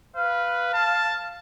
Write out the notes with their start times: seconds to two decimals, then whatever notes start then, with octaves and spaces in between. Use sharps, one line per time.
0.16 B4 F5
0.73 A5